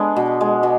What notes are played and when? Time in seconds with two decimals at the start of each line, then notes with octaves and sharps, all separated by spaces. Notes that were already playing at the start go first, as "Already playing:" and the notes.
Already playing: G#3 B3 D4
0.16 B2
0.41 G#3
0.63 B2